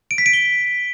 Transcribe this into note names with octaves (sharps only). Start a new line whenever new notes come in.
D7
B6
D7
G7